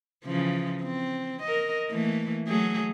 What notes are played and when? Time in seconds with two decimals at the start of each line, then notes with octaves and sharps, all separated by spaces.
0.25 C#3 E3 F3
0.84 C4
1.43 A#4 D#5
1.90 E3 A3 A#3
2.48 F#3 A3 G#4